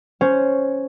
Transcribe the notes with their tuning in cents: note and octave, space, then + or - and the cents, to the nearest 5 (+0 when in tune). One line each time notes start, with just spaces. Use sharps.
C#4 +0 C5 +0